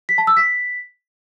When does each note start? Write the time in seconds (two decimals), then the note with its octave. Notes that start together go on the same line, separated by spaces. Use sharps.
0.09 B6
0.18 A5
0.27 E6
0.37 B6